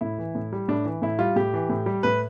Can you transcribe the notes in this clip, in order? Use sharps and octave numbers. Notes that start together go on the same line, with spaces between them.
A2 E4
E3
A2
G3
A2 D4
E3
A2 E4
G3 F4
A2 G4
E3
A2
G3
A2 B4